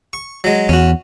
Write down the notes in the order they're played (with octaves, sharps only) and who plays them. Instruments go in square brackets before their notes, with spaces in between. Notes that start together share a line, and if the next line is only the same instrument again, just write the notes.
[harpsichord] C#6
F#3 G#3
[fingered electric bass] E2 [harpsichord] C#4 F#4